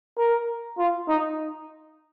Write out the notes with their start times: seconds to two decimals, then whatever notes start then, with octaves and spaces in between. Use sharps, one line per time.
0.18 A#4
0.78 F4
1.09 D#4